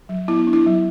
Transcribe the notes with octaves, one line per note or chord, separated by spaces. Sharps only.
F#3
B3 E4
D4
E4
F#3